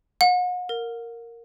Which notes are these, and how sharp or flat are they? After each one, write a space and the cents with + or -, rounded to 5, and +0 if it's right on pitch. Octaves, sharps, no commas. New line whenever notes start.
F#5 -40
A#4 -5